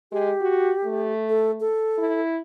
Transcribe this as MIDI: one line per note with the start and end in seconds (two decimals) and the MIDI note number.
0.12 0.33 56
0.12 1.12 67
0.41 0.72 66
0.85 1.69 57
1.29 1.51 69
1.60 2.21 69
1.98 2.40 64